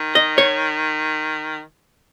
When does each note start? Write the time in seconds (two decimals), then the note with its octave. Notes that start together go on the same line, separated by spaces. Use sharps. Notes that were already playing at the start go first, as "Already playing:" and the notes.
Already playing: D#3
0.15 D#5
0.38 C#5